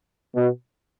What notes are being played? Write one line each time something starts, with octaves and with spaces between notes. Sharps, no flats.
B2